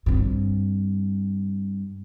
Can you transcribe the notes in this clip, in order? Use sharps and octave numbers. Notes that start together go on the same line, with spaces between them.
G2 C4